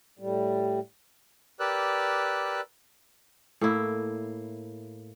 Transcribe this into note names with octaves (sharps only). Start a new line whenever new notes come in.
A2 G3
G4 A#4 B4 D5 E6 F#6
A2 A#3 E4